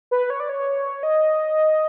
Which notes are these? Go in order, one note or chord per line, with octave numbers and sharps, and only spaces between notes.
B4
C#5
D5
C#5
D#5